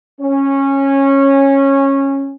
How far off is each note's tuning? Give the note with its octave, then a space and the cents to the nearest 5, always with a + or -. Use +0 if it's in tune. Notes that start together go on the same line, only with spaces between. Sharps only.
C#4 -15